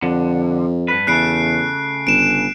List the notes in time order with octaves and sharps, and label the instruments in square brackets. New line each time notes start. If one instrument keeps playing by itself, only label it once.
[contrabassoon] F2 [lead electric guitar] D3
[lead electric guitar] G2 B4
[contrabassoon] E2 [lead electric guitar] C#3 A3 [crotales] F#6 C7 D7
[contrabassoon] G1 [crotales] D7 E7